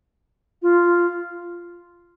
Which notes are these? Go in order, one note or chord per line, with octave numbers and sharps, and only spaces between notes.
F4